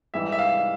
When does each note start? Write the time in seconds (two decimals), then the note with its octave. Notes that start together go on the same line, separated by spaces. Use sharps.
0.14 G#2 E3 G3 E5
0.32 E5
0.39 F5